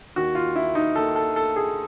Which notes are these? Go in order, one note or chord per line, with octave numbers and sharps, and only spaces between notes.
D#2 D#3 F#4
F4
E4
D#4
D#2 D#3 A4
A4
A4
G#4